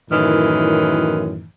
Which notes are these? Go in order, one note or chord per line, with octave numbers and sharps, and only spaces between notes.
F#2 A2 D#3 E3